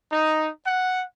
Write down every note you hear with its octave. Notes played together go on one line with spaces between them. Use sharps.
D#4
F#5